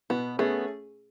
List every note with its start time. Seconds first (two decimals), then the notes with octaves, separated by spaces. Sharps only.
0.10 B2 B3
0.38 A3 B3 C#4 G#4